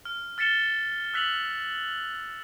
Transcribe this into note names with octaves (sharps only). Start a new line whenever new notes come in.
F6
F6 A6 B6 C#7 E7 G7
E6 F#6 B6 F7 F#7